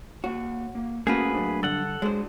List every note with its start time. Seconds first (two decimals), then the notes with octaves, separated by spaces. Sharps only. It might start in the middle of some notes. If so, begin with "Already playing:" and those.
0.24 A#3 F#4 C#5
0.75 A#3
1.07 A3 A#3 C#4 F#4 G#4 A4 B4 C5
1.35 F#3 D4
1.63 G2 D3 A4 F#5
2.02 G#3 D4 F#4 C5 C#5